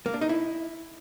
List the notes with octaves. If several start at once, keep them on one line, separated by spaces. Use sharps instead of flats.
A#3
D4
D#4
E4